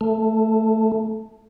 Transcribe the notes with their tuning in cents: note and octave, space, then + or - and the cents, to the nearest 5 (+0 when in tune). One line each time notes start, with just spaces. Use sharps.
A3 +5